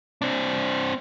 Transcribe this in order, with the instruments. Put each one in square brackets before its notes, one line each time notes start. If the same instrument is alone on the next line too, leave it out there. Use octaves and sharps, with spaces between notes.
[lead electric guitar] C4 D4